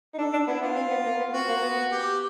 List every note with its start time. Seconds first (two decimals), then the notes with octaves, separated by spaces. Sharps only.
0.14 D#4
0.18 D4 A4
0.33 D4
0.47 B3 E4
0.61 B3 F4
0.76 C4
0.90 B3
1.05 A#3
1.19 B3
1.33 C4 F#4
1.48 A#3
1.62 B3
1.91 G4